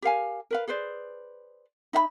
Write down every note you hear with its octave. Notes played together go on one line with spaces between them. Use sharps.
G4 A#4 F5 G#5
A#4 B4 F5
G#4 B4 C5 D5
D#4 E5 F5 B5